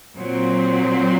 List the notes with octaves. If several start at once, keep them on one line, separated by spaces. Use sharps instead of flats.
A#2 F#3 C4